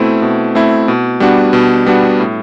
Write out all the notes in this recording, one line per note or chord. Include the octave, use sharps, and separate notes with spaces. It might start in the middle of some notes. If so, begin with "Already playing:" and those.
Already playing: B2 A3 C4 E4
B2
A3 C4 E4
B2
G3 B3 D4 F#4
B2
G3 B3 D4 F#4
A2